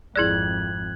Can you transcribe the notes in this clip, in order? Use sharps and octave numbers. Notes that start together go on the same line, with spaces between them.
G#1 F2 E4 G#4 D5 F#6 G#6 F#7